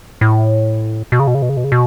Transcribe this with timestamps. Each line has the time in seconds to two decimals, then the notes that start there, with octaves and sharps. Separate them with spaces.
0.21 A2
1.12 B2
1.20 C#3
1.27 B2
1.35 C#3
1.42 B2
1.49 C#3
1.57 B2
1.64 C#3
1.72 B2